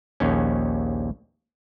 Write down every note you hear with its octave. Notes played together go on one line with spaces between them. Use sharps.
A#1 D#2 C#4